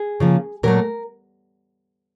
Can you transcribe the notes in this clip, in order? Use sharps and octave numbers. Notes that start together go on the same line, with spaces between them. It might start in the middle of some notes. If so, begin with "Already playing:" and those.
Already playing: G#4
C#3 F3 A#3
A#2 F#3 A3 A#4